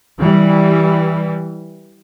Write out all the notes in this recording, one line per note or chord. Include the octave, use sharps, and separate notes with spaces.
E3 G3